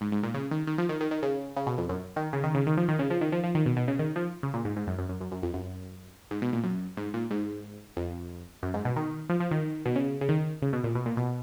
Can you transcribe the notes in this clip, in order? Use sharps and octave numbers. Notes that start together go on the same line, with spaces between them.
G#2
G#2
A#2
C#3
D#3
D#3
F3
D#3
D#3
D#3
C#3
C#3
B2
F2
F#2
D#3
C#3
D#3
C#3
D#3
F3
D#3
C#3
F3
D#3
F3
F3
D#3
B2
B2
C#3
D#3
F3
C#3
A#2
G#2
G#2
F#2
F#2
F#2
F#2
F#2
F2
F#2
G#2
B2
A#2
F#2
G#2
A#2
G#2
F2
F#2
G#2
B2
D#3
F3
F3
D#3
B2
C#3
C#3
D#3
C#3
B2
A#2
B2
A#2
B2